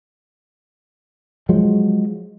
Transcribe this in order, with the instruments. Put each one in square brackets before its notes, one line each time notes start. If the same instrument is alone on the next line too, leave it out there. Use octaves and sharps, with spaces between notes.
[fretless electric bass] F3 F#3 G#3